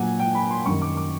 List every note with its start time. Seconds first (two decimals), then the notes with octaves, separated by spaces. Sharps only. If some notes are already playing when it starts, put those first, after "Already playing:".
Already playing: A#2 F#3 F#5 G#5
0.20 G5
0.35 B5
0.51 C6
0.65 F#2 D#3 G3 C#6
0.82 D6
0.97 D6